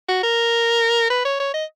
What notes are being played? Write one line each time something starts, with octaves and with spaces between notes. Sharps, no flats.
F#4
A#4
B4
C#5
C#5
D#5